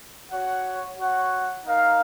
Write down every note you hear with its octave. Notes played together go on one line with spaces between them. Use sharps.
F#4 C#5 F#5
F#4 C#5 F#5
D#4 A#4 F5